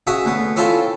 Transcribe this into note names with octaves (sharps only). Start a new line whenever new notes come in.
C#3 F#4 E5 G#5 D#6
D2 B3
C4 C#4 E4 F4 A4 C5